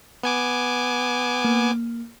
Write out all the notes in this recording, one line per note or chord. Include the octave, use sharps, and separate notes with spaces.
B3 G#5 D6
A#3